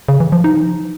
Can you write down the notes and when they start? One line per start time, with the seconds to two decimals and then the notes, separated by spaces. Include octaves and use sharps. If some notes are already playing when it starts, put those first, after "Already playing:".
0.08 C#3
0.20 E3
0.32 F3
0.44 D#4